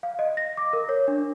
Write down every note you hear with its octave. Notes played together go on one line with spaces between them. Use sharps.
F5
D#5
A#6
D6
A#4
C#5
D4